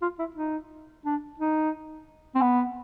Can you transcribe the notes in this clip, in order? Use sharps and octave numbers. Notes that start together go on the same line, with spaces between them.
F4
E4
D#4
D4
D#4
C4
B3